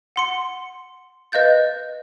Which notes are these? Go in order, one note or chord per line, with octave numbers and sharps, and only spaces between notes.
F#5 C6 C#7
B4 D#5 F5 G6 A6